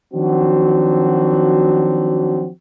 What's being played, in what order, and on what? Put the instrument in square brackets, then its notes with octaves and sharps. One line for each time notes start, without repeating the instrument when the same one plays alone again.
[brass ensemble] D#3 F3 F#3 C4 D4 F#4